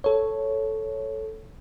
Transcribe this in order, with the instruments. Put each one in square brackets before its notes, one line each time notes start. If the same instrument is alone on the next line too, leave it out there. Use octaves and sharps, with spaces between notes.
[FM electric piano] A4 C#5